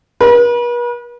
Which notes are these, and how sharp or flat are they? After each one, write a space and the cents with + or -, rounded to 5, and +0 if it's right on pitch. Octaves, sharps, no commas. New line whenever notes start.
B4 -45